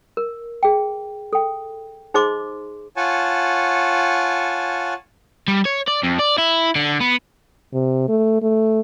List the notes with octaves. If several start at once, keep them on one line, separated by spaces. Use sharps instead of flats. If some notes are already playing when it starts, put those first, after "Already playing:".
A#4
G#4 G5
A4 G5
D#4 G#4 C5 D#5 C6 D6
F4 C#5 F#5 G#5 A5
G3
C#5
D5
F2
D5
E4
D3
B3
C3
A3
A3